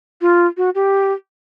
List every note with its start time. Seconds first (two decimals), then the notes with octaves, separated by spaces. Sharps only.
0.21 F4
0.57 F#4
0.75 G4